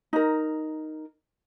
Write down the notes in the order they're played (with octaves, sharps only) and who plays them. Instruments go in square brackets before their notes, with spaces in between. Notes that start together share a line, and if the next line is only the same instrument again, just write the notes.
[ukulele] D#4 A#4